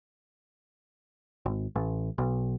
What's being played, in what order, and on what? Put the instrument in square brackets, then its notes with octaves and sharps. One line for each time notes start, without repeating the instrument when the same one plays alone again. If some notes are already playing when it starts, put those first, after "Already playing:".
[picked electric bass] G#1
A1
B1